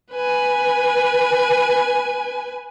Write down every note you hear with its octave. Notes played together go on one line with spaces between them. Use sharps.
B4 G#5